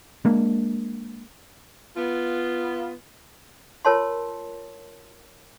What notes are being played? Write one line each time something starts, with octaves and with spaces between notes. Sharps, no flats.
G#3 A#3 D4
B3 F4
F4 A#4 C#5 A5 C6